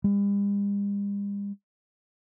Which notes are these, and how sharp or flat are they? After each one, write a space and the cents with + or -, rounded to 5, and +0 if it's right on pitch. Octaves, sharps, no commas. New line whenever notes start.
G3 +45